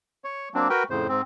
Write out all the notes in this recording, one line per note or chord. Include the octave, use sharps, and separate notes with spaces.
C#5
F#3 A#3 C4 D4
F#4 A#4 B4 G5
F2 A2 C#3 C5
G#2 C4